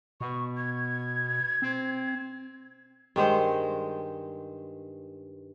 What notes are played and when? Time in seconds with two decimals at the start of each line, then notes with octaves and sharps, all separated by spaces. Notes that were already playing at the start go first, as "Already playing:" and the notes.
0.21 B2 C#6
0.57 G#6
1.62 C4
3.16 G2 D#3 G#3 C5